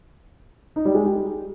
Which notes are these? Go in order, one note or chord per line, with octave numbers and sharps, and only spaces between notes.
D#4
G3
G#3
G4